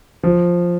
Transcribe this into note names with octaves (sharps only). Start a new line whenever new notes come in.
F3